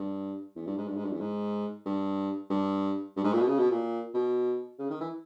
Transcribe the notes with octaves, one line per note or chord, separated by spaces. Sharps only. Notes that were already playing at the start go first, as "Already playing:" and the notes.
Already playing: G2
E2
G2
G#2
G2
G#2
G2
E2
G#2
G2
G2
G2
G#2
A#2
B2
C#3
B2
A#2
B2
C#3
D#3
E3